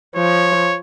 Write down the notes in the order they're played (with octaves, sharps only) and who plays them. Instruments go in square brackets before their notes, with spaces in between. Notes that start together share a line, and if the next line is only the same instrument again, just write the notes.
[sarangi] F3 [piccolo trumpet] C#5